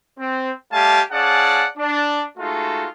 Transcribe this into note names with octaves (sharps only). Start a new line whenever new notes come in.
C4
G3 A3 G4 F5 G#5 A5
C#4 G#4 D5 F5 F#5 A5
D4
G#3 A3 D#4 F4 F#4 A4